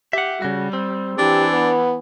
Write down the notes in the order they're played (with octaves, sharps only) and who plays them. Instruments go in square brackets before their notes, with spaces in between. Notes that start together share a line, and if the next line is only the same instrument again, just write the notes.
[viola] G4 [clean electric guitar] E5 F#5
[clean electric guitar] C#3 F#4 [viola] G3
[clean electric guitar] C4
[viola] E3 [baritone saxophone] D4 [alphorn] G4
[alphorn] B3